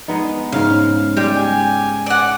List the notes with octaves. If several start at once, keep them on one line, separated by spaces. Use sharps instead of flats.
G#3 B3 D#4
G#2 C#3 F5
G3 G#3 G4
G#5
D5 F#5